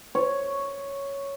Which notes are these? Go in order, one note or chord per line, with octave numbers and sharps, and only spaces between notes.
C#5